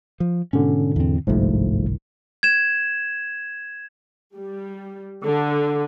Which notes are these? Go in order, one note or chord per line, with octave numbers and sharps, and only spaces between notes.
F3
G#2 B2 D3 C#4
E2 C4
G1 C2 G#2 F3 A3
G#6 E7
G3
D3